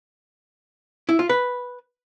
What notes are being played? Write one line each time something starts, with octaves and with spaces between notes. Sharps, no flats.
E4
F4
B4